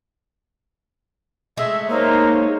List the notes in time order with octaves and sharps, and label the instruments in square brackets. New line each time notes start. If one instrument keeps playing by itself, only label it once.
[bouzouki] G#3 A3 G#4 [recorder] E5
[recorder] A#3 [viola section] D#4 C5 C#5